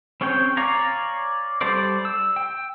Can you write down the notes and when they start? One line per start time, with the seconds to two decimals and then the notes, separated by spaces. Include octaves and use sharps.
0.21 C4 C#4 G#4 C#5 G5
0.57 C#5 D5 F5 G#5 A#5
1.61 G3 G4 A4 C5 D5
2.05 E6
2.36 G5